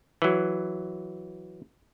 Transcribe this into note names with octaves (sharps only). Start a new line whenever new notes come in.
E3 F#3